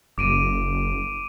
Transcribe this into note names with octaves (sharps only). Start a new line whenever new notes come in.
F#1 D6 D7 D#7